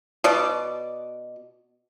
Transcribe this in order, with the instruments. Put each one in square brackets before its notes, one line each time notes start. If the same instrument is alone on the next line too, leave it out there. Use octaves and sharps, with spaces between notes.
[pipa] B2 D5